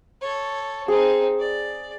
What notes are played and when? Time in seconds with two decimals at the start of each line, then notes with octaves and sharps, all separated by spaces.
0.21 A4 C#5
0.88 C4 D#4 G#4
1.39 D5